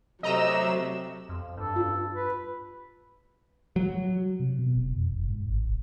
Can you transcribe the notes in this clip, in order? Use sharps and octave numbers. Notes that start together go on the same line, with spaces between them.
C3 F#3 A3 D#5 A#5 E6
F2
G2 A4
F4
B4
F#3
C3
B2
E1
F2
F1
G#2
G#1
E1